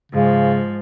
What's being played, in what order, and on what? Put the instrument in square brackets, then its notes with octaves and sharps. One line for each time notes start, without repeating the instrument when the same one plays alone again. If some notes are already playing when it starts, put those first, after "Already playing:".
[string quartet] G#2 F3 [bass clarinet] C#3